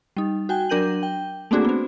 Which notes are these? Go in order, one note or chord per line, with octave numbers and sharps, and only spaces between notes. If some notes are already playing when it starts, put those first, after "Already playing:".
G3 D#4
F#4 G5 G#5
F#3 D4 A#4 G6 D#7 F#7
G5
A3 A#3 C4 D4 F#4 G#4
B3 C4